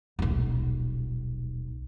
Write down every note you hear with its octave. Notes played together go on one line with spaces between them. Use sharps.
D#1 B1